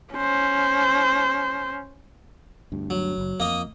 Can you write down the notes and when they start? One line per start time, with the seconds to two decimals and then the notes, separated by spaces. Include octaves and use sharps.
0.13 C#4 C5
2.72 D2 G2
2.90 F#3
3.18 F#1
3.40 F2 A#3 D#5 D#6